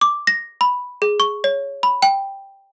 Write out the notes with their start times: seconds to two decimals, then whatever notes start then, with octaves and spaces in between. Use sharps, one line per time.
0.01 D6
0.27 A#6
0.61 B5
1.02 G#4
1.20 C#6
1.44 C#5
1.83 B5
2.02 G5